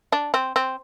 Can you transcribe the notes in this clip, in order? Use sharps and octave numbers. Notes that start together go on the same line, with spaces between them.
D4
C4
C4